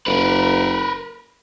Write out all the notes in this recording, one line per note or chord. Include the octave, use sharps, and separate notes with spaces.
F#1 A#4 B4